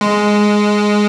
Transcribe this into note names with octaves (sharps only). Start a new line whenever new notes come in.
G#3